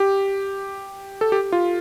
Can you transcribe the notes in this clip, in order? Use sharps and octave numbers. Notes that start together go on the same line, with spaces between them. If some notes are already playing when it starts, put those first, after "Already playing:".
Already playing: G4
A4
G4
F4